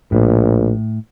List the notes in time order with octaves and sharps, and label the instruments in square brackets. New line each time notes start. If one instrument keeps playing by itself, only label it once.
[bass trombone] A#1 [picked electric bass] A2